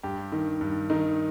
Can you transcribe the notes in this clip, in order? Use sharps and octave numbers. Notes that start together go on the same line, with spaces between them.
G2 G4
D#3
G2
D#3 D#4